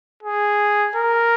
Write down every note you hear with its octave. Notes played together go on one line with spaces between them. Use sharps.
G#4
A#4